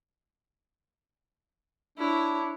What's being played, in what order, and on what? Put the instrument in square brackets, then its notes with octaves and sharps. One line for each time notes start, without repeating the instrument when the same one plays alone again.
[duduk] D4 [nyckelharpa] E4 C#5